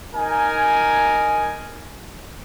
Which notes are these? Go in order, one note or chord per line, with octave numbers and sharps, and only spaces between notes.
D#4 A#4 G#5